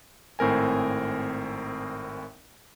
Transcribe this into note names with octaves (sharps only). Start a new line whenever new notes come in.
G#1 A2 C4 A#4 G#5